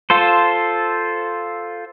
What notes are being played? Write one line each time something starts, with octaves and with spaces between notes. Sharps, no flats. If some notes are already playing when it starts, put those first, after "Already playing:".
F4 A4 C5